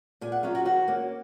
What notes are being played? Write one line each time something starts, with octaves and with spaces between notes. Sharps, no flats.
A#2 G#5
F#5
F#3 C#4 F4 F5
F#4
D#3 F#4
A#3 C#4